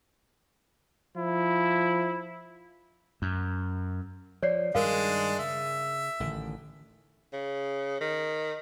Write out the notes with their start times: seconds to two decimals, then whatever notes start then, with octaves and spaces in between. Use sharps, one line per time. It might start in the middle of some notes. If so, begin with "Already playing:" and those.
1.17 F3 E4
3.22 F#2
4.43 F3 C#5 D5 C7
4.75 G2 D#3 G#3 D4 A#4 F5
5.39 C#3 E5
6.20 A1 D3 D#3
7.33 C#3
8.01 D#3